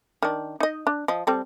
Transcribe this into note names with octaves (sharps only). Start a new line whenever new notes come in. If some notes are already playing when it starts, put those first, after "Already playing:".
D#3 D4
D#4 D#5
D4
F3 D#5
G3 C4 A4